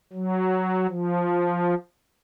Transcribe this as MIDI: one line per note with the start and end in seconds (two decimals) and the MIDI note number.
0.13 0.86 54
0.88 1.74 53